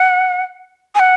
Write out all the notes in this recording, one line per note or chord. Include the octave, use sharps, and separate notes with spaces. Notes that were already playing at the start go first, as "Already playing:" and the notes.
Already playing: F#5
G#5
F#5